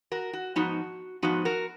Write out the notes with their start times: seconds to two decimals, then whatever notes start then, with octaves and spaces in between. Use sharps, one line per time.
0.12 F#4 A#4
0.33 F#4
0.56 G#2 F3 B3 D#4 F#4
1.22 G#2 F3 B3 D#4 F#4
1.45 F#4 A#4